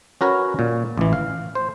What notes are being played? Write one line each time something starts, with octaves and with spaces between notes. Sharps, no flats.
C#4 F#4 A#4 B4 C#5
A#2
A1 E3
F5
C5